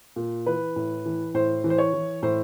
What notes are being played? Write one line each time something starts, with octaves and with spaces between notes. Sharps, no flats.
A#2
E3 B4
A2
E3
A2 C5
E3
C5
C#5
E3
A2 C5